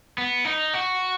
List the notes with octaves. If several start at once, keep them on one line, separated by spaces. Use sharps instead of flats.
B3
D#4
F#4